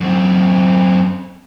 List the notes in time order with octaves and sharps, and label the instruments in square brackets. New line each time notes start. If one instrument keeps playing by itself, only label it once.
[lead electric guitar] F#2 C4